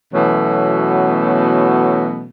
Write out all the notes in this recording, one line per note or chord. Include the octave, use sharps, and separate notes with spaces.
B2 E3 F#3 A3 B3 C#4